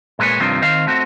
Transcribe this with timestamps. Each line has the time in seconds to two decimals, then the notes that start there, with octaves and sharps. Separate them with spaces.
0.19 A#2 G#3 A#4 B4 C#5
0.40 G2 C3 D#3 F3 C4
0.62 D#3 C4 F5
0.87 A3 C4 F#4